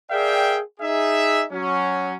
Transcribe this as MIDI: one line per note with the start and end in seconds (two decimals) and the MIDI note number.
0.10 0.59 68
0.10 0.59 70
0.10 0.59 74
0.10 0.59 76
0.10 0.59 77
0.10 0.59 79
0.80 1.45 63
0.80 1.45 68
0.80 1.45 76
1.52 2.15 54
1.52 2.15 61